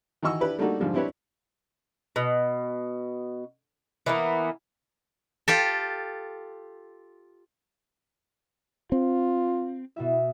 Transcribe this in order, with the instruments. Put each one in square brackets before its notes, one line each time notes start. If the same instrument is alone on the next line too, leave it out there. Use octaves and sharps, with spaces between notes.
[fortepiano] D#3 E3 F#4 D#5 C#6 E6
D4 E4 G4 B4
G3 A3 A#3 D4 D#4 F#4
G#2 D3 F3 G3
C4 D4 E4 G4 B4 C#5
[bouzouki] B2
E3 A#3 B3
[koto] F4 G4 A4
[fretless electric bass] C4 [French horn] F4
[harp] B2 F#4 E5 [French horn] E4